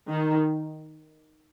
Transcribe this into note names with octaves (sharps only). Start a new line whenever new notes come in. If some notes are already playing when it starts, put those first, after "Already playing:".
D#3